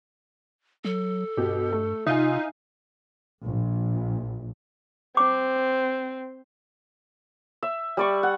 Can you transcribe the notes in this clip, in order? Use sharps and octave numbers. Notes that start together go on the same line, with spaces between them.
F#3 A4
G2 B2 G4
A3
C3 D#4 F4 E5 F5 G#5
A#1
C4 D6
E5
G3 D5 C#6
F#5